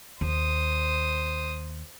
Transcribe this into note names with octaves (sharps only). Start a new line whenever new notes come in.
D#2 C5 D#6